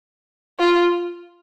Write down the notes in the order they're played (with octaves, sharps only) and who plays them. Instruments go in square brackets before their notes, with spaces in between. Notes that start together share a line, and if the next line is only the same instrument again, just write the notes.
[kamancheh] F4